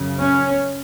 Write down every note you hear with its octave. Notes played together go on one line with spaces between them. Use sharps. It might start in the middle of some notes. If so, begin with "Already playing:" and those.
Already playing: F#2 C#3
C#4